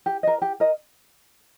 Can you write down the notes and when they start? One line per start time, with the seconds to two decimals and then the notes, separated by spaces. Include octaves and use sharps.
0.06 G4
0.23 A#4 D#5
0.42 G4
0.60 A#4 D#5